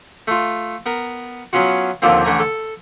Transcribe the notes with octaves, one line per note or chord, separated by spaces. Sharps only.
A3 F4
B3 A#4
F#3 B3 C#4 F4 F#4
D#2 A#2 D3 F3 C4
A1 D3 A3 G#5 A#5
A4